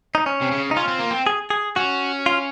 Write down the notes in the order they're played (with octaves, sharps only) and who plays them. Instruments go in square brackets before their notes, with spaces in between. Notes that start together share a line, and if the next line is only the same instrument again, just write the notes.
[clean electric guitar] D#4
C#4
[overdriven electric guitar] C3
C#3
[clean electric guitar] D#4
[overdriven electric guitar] C#4 [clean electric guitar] F4
[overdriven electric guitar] C4
A#3
C4
[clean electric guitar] G#4
G#4
[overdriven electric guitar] C#4 [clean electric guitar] F#4
[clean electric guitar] F4